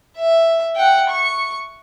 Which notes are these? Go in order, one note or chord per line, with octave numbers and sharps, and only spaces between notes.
E5
F#5 G5
C#6